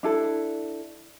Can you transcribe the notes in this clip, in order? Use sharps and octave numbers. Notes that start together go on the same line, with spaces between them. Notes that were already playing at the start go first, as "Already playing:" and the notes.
D4 E4 A4